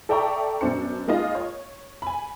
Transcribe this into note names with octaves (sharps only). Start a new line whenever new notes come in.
A4 D5 E5 G5 A#5 C#6
F#2 B2 D4 C5 C#7
G#3 A#3 D#4 F4 D#5
C#5
G#5 B5